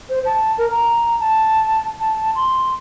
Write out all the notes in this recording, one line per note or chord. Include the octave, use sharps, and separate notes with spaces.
C5
A5
A#4
A#5
A5
A5
C6